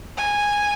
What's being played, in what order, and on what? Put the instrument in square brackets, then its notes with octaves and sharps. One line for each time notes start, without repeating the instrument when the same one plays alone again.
[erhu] G#5